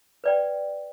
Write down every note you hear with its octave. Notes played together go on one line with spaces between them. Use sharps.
B4 D5 G5